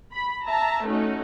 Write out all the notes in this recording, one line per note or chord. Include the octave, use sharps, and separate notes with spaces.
B5
E5 A5 A#5
A3 C#4 D#4 F#4